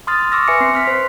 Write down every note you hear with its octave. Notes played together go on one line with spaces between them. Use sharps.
C6 D#6 F6 A6
C#6 D6 E6 F6 A#6
B4 E5 G#5 C6 C#7
C4 C7
C6 F6 B6
C5